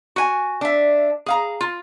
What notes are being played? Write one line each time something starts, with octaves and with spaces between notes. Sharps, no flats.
F#4 G#5
D4 E5
G#4 F5 A#5
F4